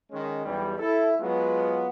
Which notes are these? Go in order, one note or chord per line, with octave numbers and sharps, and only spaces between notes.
D#3 G#3 C#4
B1 E2 G3
E4 A4
F#3 G#3 B3 F4